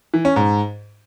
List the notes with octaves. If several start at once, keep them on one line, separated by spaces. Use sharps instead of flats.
E3
C#4
G#2